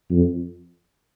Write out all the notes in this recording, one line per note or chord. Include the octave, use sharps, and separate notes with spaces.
F2